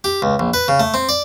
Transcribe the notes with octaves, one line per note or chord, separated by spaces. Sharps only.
G4
C#2
A#1
B4
C#3
A3
C4
D5